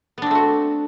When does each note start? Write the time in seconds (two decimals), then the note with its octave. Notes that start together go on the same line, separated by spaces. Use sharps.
0.18 B3
0.22 D4
0.26 C4
0.31 A3
0.35 F#4